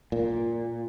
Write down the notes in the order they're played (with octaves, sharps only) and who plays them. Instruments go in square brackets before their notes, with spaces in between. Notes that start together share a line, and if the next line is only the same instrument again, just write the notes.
[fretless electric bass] A#2